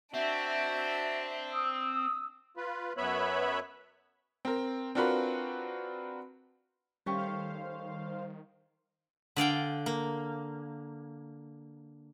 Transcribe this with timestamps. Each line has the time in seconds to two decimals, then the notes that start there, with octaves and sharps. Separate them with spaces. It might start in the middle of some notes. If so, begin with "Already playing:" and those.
0.14 C4 D4 F#4 E5
1.50 D#6 E6
2.57 F4 B4
2.97 F#2 B3 B4 C#5 E5 B5
4.45 C4 A#4
4.95 C4 D4 F4 F#4 A#4 B4
7.06 D#3 G3 A3 C#4 G4 C5 F5
9.36 D3 D5 F5 G5
9.86 A#3